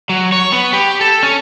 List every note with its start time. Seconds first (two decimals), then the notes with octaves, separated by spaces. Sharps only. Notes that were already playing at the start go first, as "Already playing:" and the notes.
0.09 F#3
0.32 C#5
0.52 B3
0.73 G4
1.01 A4
1.23 C#4